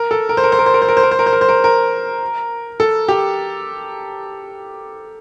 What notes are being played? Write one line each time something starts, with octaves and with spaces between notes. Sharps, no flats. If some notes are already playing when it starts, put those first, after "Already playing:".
Already playing: A#4
A4
A#4
C5
A#4
C5
A#4
C5
A#4
C5
A#4
C5
A#4
C5
A#4
C5
A#4
C5
A#4
A#4
A4
G4